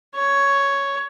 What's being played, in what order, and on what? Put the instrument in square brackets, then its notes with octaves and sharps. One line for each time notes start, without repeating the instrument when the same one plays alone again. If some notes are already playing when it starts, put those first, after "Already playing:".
[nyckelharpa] C#5